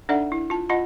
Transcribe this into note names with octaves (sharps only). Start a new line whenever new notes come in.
D4 D#4 A4 D5 E5 F#5
E4
F4 A5
F4 D#5 F#5 A5 B5